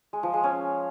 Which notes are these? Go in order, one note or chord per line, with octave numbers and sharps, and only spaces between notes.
G#3
F3
G#3
C#4